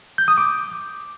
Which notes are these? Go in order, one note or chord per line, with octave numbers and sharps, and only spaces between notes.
G6
D#6
D6